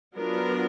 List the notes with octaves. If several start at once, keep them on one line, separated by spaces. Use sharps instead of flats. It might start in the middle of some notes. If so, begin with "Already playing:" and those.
F#3 B3 D4 F4 A#4